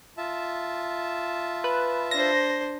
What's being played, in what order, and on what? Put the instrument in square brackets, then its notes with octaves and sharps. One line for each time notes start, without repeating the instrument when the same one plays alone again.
[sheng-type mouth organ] F4 E5 A5
[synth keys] B4
[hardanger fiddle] D4 C5 [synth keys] A#6